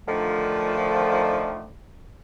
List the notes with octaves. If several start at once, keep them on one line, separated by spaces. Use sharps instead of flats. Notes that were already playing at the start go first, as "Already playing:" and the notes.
D3 D#3 F3 A3